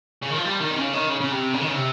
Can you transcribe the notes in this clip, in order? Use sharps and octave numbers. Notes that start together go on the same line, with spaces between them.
C#3
D#3
F3
G3
D#3
C3
C#3
D#3
C#3
C#3
C3
C#3
D#3
C#3
C3